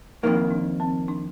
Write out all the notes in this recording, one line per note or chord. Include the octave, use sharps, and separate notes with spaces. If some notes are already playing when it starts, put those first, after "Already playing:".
F2 D#3 A#3 D#4
D4
C4
D4